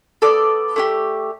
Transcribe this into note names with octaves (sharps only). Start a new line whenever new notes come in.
B3 F4 A4 D5
A3 E4 G4